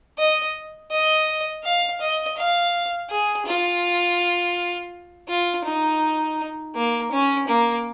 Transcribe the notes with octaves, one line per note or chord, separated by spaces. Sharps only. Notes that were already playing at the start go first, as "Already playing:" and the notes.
D#5
D#5
F5
D#5
F5
G#4
F4
F4
D#4
A#3
C#4
A#3